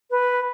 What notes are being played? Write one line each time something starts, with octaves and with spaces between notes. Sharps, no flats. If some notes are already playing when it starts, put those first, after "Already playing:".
B4